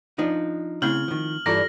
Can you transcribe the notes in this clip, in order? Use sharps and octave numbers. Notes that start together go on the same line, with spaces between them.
F3 D4 D#4
C#3 A3 C4 E4 F6 F#7
D#3 F3
G2 E3 F4 A4 D5 A#5 A#6